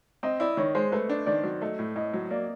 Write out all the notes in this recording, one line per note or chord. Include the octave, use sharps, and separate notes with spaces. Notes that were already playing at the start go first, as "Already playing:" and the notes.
C4 D#5
E4 D5
D#3 C#5
G#3 C5
A3 B4
D4
D#3 D5
F#3
A3 D#5
A2
A2 D#5
F#3
A#3 D5